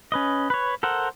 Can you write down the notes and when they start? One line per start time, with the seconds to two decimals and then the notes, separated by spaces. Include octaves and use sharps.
0.12 C#4 B4 D#5
0.50 B4 C#5
0.83 A4 A#4 C5 F#5